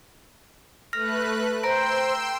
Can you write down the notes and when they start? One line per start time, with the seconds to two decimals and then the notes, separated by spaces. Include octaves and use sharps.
0.93 A3 B4 F6 F#6 A#6
1.63 C5 G5 A#5 C6 E6 A#6 D7